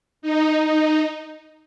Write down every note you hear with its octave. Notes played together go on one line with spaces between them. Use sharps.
D#4
D#4